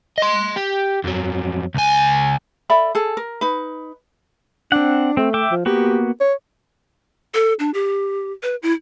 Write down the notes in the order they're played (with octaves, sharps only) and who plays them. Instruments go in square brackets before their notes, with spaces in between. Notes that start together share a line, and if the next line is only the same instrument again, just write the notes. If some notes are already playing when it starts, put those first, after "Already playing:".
[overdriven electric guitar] D#5 C6
G4
F2 F#3
C#2 G#5
[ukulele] A4 D5 E5 B5
G#4 A4
A#4
D#4 B4
[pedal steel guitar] C4 F#5 [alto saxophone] D4
[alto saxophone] A3 [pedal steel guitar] C4
[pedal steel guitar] E5 G5 D6
[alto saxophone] F3
[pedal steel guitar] A#3 B3 F#4 [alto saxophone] G4
[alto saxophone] C#5
[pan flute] A4
D4
G4
B4
E4